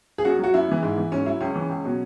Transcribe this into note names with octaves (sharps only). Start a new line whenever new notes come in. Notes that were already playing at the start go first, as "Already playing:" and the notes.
G#4
F#2 F#4
F#3 F#4
F#2 E4
C#3 E3
G#2
E3
G#2 C#4
F#3 E4
C#2 C#4
C#3 E3
C#2
B2 F#3